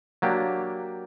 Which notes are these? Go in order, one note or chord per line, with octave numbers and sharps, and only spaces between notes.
F#3 A#3 D4 G4